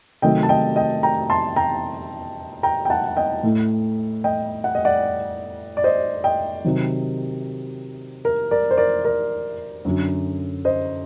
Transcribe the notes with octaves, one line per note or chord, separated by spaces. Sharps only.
C3 D#3 F#3 A3 D#5 G5
A5
D#5 G5
D#5 G5
G5 A#5
A5 C6
G5 A#5
G5 A#5
G5
F#5 A5
D#5 G5
A2 A3
D#5 G5
F#5
D#5
D5 F#5
D5
C5 D#5
D#5 G5
C3 D#3 F#3
A#4
A#4 D5
C5
A#4 D5
A#4 D5
F#2 D3 F#3
C5 D#5